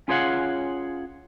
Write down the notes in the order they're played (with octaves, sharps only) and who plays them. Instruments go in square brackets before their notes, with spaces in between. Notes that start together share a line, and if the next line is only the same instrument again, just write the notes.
[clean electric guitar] C#4 F4 G#4 C#5 F5 F#5